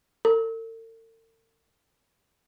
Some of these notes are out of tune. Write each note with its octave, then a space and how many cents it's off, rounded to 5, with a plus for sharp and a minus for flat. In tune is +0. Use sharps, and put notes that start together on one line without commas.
A4 +45